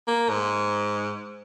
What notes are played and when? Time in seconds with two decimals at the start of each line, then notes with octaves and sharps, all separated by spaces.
0.08 A#3
0.30 G#2